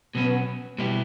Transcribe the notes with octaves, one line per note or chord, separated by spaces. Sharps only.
B2 F#3 B3 C#4
B2 G3 B3 E4 G4